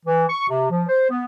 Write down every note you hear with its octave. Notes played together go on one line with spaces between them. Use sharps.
E3
C#6
C3
F3
C5
B3